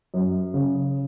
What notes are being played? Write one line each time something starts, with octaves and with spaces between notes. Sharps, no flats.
F#2
C#3